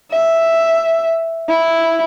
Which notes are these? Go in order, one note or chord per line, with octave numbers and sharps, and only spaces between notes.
E5
E4